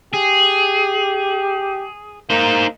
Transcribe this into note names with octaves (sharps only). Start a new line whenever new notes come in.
G4 G#4
A#3 D#4 C5